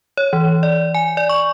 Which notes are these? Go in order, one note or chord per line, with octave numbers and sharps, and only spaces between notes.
C#5
E3
D5
G#5
D5
C#6